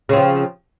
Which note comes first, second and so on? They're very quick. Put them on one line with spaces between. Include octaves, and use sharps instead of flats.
C#3 C4 F3